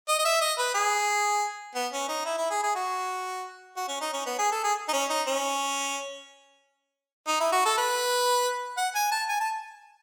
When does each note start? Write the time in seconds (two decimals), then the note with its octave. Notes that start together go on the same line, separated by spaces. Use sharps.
0.09 D#5
0.19 D#5
0.25 E5
0.41 D#5
0.58 B4
0.75 G#4
1.75 B3
1.93 C#4
2.09 D#4
2.25 E4
2.38 E4
2.50 G#4
2.63 G#4
2.75 F#4
3.77 F#4
3.88 C#4
4.01 D#4
4.13 C#4
4.26 B3
4.39 G#4
4.52 A4
4.64 G#4
4.89 D#4
4.93 C#4
5.10 D#4
5.27 C#4
7.28 D#4
7.40 E4
7.52 F#4
7.66 A4
7.78 B4
8.78 F#5
8.95 G#5
9.12 A5
9.29 G#5
9.40 A5